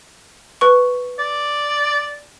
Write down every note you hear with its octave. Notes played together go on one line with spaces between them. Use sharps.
B4 C#6
D5